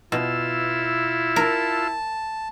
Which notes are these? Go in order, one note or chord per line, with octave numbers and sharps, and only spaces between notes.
B2 E4 F4 E6
A#4 A5